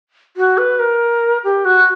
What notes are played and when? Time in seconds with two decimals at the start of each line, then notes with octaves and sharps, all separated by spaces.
0.37 F#4
0.58 B4
0.80 A#4
1.44 G4
1.65 F#4